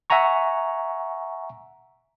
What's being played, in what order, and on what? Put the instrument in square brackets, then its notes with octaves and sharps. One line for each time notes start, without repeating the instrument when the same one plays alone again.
[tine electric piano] E5 F#5 G#5 A#5 C#6